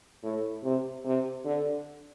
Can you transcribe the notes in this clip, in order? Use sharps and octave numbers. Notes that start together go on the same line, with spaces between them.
A2
C3
C3
D3